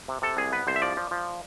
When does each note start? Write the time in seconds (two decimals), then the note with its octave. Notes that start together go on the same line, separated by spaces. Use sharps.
0.08 C3
0.22 C3 A4
0.37 C2 G#4
0.52 B3 B4
0.67 C2 C5
0.76 E5
0.82 F3 D5
0.97 F3
1.11 F3